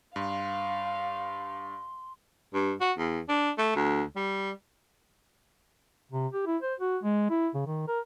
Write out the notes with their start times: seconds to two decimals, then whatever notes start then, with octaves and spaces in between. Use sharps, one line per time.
0.16 G2 F5 C6
2.54 G2
2.80 F#4
2.98 E2
3.28 D4
3.58 A3
3.76 D2
4.16 G3
6.12 C3
6.33 G4
6.46 E4
6.62 C5
6.80 F#4
7.03 G#3
7.30 E4
7.54 C#3
7.67 D#3
7.88 A#4